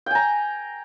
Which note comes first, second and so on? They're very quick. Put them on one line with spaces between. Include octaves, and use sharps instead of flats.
G5 G#5 A#5